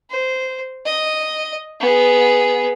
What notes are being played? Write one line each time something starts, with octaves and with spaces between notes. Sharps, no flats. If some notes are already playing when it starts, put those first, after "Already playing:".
C5
D#5
B3 G#4